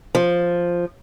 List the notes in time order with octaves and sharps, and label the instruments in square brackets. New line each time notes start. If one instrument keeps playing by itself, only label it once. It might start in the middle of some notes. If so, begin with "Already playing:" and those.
[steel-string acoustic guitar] F3